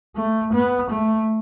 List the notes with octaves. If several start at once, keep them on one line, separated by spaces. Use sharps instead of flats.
A3
B3
A3